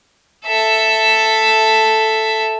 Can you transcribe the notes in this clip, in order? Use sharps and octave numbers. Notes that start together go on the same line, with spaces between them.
A4 E5